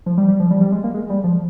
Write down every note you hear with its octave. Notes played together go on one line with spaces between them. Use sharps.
F3
G3
G3
F3
G3
G3
G#3
A#3
G#3
G3
F3